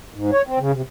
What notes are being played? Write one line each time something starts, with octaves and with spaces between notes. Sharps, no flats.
G#2
C#5
C4
C#3
C3